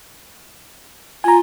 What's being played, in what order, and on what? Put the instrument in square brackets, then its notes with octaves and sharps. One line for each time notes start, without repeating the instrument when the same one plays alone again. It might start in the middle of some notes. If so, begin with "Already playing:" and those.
[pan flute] F4 [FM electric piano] G#5 A#5